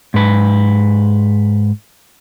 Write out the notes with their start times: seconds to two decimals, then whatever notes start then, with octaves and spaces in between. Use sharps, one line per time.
0.14 G#2 B4